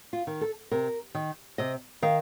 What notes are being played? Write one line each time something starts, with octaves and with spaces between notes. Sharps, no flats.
F4
D#3
A4
C3 A#4
D#3
C3 D#5
D#3 F5